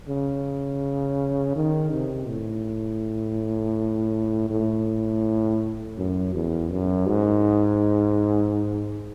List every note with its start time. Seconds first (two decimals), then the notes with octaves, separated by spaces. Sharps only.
0.08 C#3
1.56 D#3
1.92 C3
2.28 A2
4.50 A2
5.97 F#2
6.34 E2
6.71 F#2
7.08 G#2